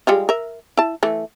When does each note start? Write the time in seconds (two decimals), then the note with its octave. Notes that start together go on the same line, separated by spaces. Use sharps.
0.07 G3 G#3 F4
0.29 A#4 E5
0.77 E4 A5
1.03 E3 A3